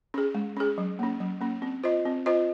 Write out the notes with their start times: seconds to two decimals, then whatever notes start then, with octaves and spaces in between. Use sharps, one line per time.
0.14 C#4 G#4
0.35 G#3
0.57 C#4 G#4
0.78 F#3
0.99 A#3 C#4
1.20 F#3
1.41 A#3 C#4
1.62 C4
1.84 F4 C5 D#5
2.05 C4
2.26 F4 C5 D#5